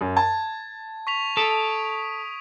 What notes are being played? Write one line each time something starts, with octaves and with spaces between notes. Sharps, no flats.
F#2
A5 G#6
C#6 B6 F7
A4 D#6 B6 D7